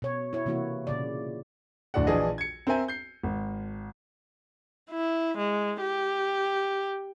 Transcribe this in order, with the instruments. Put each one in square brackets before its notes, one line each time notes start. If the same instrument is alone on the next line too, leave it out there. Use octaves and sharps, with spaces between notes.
[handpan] B2 C#5
E4 C#5
C3 E3 A#3 E4 F#4
A#2 C#3 D5
[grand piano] D1 D2 D4 F#4 F#5
A#1 E3 D4 G#4 D#5
G#6 C#7
C4 A#4 C5 E5 G#5
G6 C7
G#1
[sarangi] E4
G#3
G4